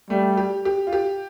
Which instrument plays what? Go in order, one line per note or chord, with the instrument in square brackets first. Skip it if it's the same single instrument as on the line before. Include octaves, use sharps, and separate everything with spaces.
[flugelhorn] G3 [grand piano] A3
[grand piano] G4
G4
F4
G4